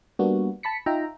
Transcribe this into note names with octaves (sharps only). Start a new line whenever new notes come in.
G3 A#3 B3 D4 F#4
A5 B5 B6 C#7
D#4 F4 E5 G5 A#5